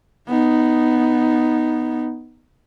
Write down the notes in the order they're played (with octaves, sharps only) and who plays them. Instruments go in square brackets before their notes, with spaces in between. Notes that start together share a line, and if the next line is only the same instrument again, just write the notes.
[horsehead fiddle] B3 D#4